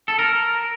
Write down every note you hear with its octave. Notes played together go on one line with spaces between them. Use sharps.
A4
A#4